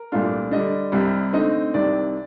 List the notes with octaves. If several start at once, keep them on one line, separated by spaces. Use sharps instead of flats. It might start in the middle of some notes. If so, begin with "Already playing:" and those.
Already playing: A#4
C2 A#2 A3 D4 F4
D3 G3 D4 D#5
C2 C3 G3
D3 A3 C4 D#4 D#5
C2 C3 D#3 D5